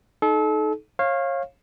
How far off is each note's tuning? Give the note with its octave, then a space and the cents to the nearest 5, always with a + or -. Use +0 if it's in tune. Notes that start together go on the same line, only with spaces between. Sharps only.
D#4 +0 A4 -35
C#5 -30 F5 +0